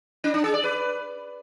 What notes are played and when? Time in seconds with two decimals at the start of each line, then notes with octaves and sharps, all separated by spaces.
0.24 C#4
0.34 D4
0.44 G#4
0.54 D5
0.64 B4